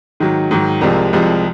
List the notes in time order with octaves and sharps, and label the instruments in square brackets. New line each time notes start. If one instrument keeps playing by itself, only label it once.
[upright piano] G#2 D#3 F#3
G#2 D#3 F#3
C2 C3 F3 G#3 A#4
C2 C3 F3 G#3